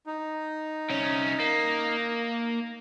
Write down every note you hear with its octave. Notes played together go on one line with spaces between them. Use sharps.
D#4
C2 C#4
A#3